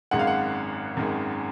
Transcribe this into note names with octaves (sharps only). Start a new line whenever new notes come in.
G#1 F#2 D#3 G#3 F#5
F5
F#5
G#1 F#2 D#3 G#3